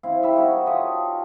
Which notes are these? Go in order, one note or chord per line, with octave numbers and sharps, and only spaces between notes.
C4 E4 F5
G3 E5 B5
D#4 F#4 A#4 C#5
F4 G4 A4 D#5